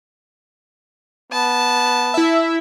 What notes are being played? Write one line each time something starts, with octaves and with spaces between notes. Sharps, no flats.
B3 A5
E4 E5